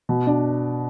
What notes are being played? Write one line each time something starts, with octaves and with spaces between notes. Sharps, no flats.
B2
D4